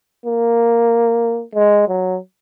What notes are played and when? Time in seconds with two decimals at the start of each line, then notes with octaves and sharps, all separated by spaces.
0.26 A#3
1.55 G#3
1.88 F#3